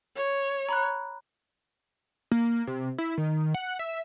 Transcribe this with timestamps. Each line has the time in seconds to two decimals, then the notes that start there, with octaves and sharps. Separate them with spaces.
0.16 C#5
0.69 A#5 B5 F#6
2.32 A#3
2.67 C3
2.98 E4
3.18 D#3
3.54 F#5
3.79 E5